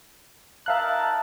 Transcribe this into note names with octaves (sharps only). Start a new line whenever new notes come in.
D#4 A#4 E5 F5 A5 F#6